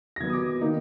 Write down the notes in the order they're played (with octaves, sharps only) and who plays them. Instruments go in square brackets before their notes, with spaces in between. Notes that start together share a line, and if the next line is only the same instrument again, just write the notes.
[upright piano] A#6
D#3 F#3 B3 G#6
D#6
D6
D#3 A#3 D#4